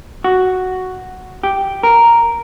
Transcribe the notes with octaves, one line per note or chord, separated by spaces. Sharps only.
F#4
G4
A#4